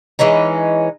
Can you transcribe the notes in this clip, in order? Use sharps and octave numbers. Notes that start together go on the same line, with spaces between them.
E3 G#3 C#4 D#4